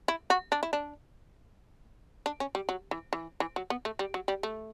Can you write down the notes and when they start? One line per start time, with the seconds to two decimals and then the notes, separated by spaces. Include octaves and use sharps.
0.08 E4
0.30 F#4
0.52 D4
0.63 E4
0.73 D4
2.26 D4
2.40 C#4
2.55 G3
2.69 F#3
2.91 E3
3.13 E3
3.40 E3
3.56 F#3
3.70 B3
3.85 A3
3.99 G3
4.14 F#3
4.28 G3
4.43 A3